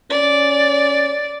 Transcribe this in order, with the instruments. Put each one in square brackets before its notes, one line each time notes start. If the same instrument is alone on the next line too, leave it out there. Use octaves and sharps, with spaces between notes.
[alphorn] C#4 [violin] D5